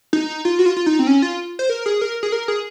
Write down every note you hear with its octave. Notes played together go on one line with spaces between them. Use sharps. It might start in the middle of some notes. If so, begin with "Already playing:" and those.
D#4
F4
F#4
F4
F4
D#4
C4
C#4
F4
C5
A#4
G#4
A#4
G#4
A#4
G#4